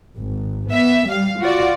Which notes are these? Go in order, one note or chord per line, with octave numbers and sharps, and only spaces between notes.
G#1
B3 E5
G3 F5
F4 F#4 D5